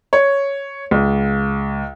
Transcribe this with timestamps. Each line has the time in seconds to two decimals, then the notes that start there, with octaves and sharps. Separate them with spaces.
0.13 C#5
0.91 C#2